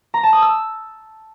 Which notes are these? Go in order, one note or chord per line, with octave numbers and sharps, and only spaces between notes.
A#5
A5
D#6
E6